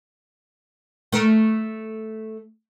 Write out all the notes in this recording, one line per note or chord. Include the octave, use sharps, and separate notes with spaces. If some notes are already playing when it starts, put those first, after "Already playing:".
A3 A#4